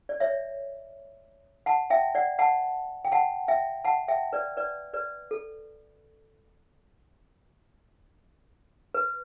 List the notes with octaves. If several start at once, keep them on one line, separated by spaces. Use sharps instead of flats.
D5
C#5 E5
F#5 A5
E5 G5
D5 F#5
F#5 A5
G5
F#5 A5
E5 G5
F#5 A5
E5 G5
B4 D5
B4 D5
B4 D5
A4
B4